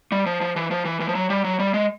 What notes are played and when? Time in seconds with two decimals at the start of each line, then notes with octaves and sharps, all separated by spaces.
0.12 G3
0.26 F3
0.41 F3
0.56 E3
0.71 F3
0.85 E3
1.00 E3
1.09 F3
1.15 F#3
1.30 G3
1.44 F#3
1.59 G3
1.74 G#3